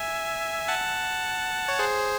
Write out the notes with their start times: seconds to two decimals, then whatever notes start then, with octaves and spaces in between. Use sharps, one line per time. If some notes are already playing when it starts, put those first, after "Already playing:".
Already playing: E5 G#5
0.68 F#5 A5
1.68 C#5
1.79 G#4 C5